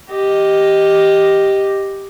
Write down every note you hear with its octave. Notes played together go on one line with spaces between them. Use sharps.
G4 D#5